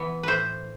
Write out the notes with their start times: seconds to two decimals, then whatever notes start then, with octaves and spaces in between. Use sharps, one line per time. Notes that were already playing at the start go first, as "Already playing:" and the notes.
Already playing: E3 B3
0.23 A2 B4 C5